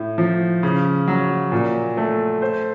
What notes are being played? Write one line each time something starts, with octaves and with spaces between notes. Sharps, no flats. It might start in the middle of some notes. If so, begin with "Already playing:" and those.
Already playing: A2
F3
C#3
F#3
A#2
A3
C5